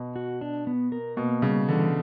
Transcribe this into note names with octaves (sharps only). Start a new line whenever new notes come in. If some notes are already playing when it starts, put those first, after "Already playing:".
Already playing: B2
F#4
D4
B3
A#4
B2 A#3
C#3 G3
D3 E3